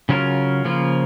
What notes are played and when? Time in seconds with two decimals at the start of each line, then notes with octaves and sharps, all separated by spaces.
0.09 C#3 F#3 C#4 F4 A#4
0.65 C#3 F3 A#3 F4